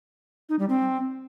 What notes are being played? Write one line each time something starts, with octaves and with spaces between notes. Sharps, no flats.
D#4
G3
C4